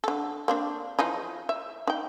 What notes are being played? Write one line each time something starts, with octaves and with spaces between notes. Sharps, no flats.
D3 A4
A#3 C4 D4
E3 F3 D#4
E5
D#4 G5